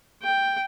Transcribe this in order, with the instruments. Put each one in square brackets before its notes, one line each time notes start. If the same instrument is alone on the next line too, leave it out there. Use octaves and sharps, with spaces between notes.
[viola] G5